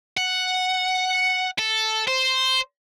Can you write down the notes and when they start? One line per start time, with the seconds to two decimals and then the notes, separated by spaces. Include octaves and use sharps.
0.17 F#5
1.58 A4
2.08 C5